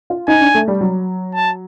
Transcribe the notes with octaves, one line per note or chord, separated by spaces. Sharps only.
F4
D#4 G#5
D4
A3
G3
F#3
A5